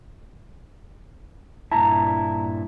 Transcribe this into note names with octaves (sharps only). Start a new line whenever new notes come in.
G2 A#2 E4 A5 A#5